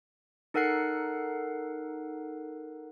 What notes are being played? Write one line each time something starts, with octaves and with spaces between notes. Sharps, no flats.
D#4 A4 A#4 F#5 F#6 C7